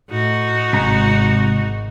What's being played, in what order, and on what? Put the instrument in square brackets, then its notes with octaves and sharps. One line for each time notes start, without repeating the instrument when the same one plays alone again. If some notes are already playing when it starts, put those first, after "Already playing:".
[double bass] A2 [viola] D#4 F#4
[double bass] G#1 [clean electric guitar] C3 A#5 [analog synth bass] G#3